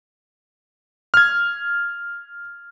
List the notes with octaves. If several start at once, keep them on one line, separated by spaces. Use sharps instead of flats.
F6 G#6